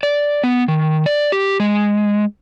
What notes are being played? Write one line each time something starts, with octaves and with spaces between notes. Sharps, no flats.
D5
B3
D#3
D5
G4
G#3